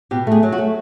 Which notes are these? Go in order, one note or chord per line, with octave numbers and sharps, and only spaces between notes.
B2 G4
A3 G#4
F#3
F#4
A3